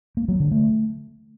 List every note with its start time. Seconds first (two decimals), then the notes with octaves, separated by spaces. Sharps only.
0.17 A#3
0.28 F#3
0.40 D3
0.51 A3